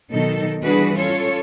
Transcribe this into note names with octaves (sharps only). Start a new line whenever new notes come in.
B2 D#3 F#3 D#4 A4
E3 G3 D4 F#4 G#4 B4
C#4 F4 A4 C#5